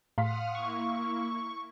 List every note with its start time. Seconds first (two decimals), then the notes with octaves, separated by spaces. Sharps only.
0.18 A2 F5 F#5 C6 D#6 F6 B6
0.55 A#3 E4 C#6